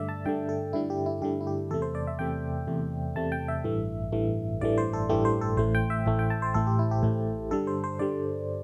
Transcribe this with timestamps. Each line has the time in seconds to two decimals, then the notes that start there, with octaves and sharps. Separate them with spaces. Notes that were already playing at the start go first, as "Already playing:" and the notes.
Already playing: G2 D3 A3 D5 E5
0.09 A5
0.26 G2 D3 A3 G5
0.49 A4
0.73 G2 D3 A3 E4
0.90 G4
1.06 E4
1.22 G2 D3 A3 G4
1.41 E4
1.47 G4
1.71 E2 C3 A3 A4
1.82 C5
1.95 D5
2.07 E5
2.19 E2 C3 A3 G5
2.67 E2 C3 A3
3.15 E2 C3 A3 A5
3.32 G5
3.48 E5
3.64 A1 G2 E3 A3
4.12 A1 G2 E3 A3
4.61 A1 G2 E3 A3 D5
4.78 C5
4.93 A4
5.09 A1 G2 E3 A3 G4
5.25 C5
5.41 A4
5.57 A1 A2 A3 C5
5.75 G5
5.90 E5
6.06 A1 A2 A3
6.19 G5
6.30 A5
6.42 C5
6.54 A1 A2 A3 A4
6.67 G4
6.79 E4
6.91 G4
7.03 A1 A2 A3
7.51 G2 D3 G3 A4
7.67 C5
7.84 C5
7.99 G2 D3 G3 D5